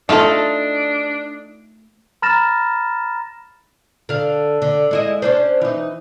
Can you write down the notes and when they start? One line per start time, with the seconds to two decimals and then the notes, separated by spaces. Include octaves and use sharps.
0.09 A3 D4 D#4 F4 A4
2.22 A#5 B5 F6 A6 A#6 E7
4.09 D3 F5
4.62 D3
4.91 G#3 E4 D#5
5.22 C#4 D4 C5
5.61 E3 D#4